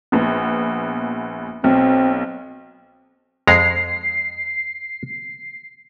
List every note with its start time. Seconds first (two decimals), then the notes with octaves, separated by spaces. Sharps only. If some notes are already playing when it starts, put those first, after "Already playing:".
0.12 A#1 B3
1.64 B1 C4
3.47 F2 G#3 A#5 C7